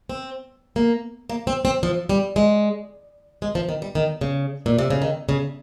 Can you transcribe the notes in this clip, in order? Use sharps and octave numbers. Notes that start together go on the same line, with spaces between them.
C4
A#3
A#3
C4
C4
F3
G3
G#3
G#3
F3
D#3
G3
D#3
C#3
A#2
C3
C#3
D#3
C#3